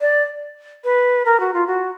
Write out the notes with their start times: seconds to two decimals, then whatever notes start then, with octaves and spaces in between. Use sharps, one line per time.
0.01 D5
0.84 B4
1.25 A#4
1.40 F#4
1.54 F4
1.67 F#4